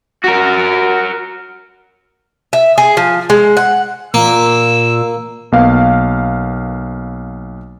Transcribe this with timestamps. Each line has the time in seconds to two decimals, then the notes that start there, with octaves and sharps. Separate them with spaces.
0.24 F#4 A#4
2.53 E5
2.78 G#4
2.97 F3
3.30 G#3
3.57 F#5
4.14 A#2 A#3 E6
5.52 B1 A#3 B3 F5